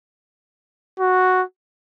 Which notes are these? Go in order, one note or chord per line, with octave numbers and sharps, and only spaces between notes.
F#4